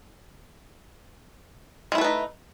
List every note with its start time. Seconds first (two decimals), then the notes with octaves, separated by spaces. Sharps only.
1.92 G#3
1.95 E4
1.98 A3
2.01 B4
2.05 D#4